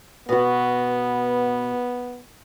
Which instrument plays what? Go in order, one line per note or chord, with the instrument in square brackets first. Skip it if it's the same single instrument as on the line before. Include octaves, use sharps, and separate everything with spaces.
[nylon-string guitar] B2 F#4 [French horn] B3